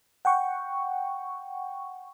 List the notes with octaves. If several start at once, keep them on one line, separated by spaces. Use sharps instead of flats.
F#5 G5 C#6